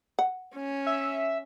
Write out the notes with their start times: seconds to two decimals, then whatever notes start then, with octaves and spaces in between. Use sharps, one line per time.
0.19 F#5
0.55 C#4
0.87 E5